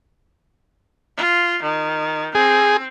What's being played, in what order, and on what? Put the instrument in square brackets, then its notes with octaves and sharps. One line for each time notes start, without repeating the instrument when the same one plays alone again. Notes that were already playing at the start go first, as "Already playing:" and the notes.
[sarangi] F4
D#3
[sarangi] C4 [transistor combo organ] G#4